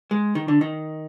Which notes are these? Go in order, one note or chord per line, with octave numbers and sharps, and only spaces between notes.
G#3
D#3
D3
D#3